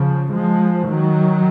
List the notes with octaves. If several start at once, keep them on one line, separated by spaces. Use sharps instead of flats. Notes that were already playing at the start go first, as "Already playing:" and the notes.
Already playing: C#3 F3
F3 G#3
D#3 F#3